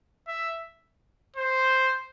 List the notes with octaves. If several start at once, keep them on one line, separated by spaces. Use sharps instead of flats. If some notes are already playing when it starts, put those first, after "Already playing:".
E5
C5